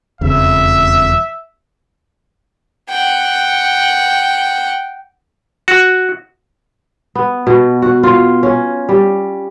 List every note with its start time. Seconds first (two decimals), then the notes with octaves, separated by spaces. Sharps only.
0.21 E1 F2 C#3 E5
2.90 F#5 G5
5.68 F#4
7.15 B3
7.47 B2
7.82 F#4
8.03 F4
8.43 C#4
8.89 G3